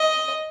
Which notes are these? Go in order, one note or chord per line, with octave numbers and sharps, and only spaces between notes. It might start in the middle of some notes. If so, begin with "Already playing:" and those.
Already playing: D#5